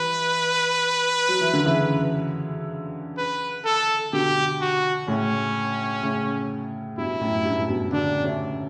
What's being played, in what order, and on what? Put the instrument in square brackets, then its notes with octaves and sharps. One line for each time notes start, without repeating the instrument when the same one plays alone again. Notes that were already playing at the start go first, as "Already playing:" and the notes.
Already playing: [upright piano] E3 G3 [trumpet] B4
[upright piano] F#3
E3
D3
C#3 E3
[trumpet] B4
A4
[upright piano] B2 D3 [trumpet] G4
[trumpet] F#4
[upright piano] A2 C#3 [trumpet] C#4
[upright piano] A2 C#3
[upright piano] G2 B2 [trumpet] E4
[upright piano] F#2 A2
G2
A2
G2 B2
C#3
[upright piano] B2 D3 [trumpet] D4
[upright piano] A3 C#4